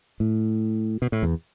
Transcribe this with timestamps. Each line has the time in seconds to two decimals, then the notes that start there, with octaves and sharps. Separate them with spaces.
0.20 A2
1.02 B2
1.12 A2
1.23 E2